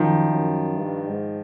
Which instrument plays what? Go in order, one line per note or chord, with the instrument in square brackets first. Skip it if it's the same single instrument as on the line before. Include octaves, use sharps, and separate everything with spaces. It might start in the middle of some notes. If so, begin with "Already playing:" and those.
Already playing: [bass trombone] F#2 [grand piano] D#3 F3
[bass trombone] F#2
G2
G#2